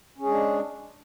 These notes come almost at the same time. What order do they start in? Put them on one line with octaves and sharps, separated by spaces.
C#4 G#4 G#3 D4